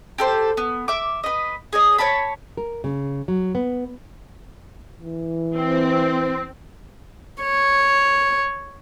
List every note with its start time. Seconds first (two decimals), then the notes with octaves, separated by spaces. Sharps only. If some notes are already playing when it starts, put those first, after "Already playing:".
0.18 G4 A4 C5
0.57 B3
0.88 E5 D6
1.23 B4 D#5
1.73 G#4 C#5 D#5
1.98 C#5 D5 A5 B5
2.57 A#4
2.84 C#3
3.28 F#3
3.55 B3
5.00 E3
5.56 C4
7.43 C#5